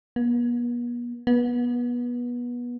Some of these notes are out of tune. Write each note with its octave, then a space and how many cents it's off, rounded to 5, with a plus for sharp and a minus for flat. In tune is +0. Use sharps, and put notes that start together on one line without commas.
B3 -45
B3 -25